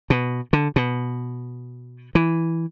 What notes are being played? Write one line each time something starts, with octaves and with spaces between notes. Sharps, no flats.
B2
D3
B2
E3